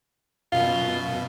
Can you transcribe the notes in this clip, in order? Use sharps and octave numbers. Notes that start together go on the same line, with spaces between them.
F#2 B2 F4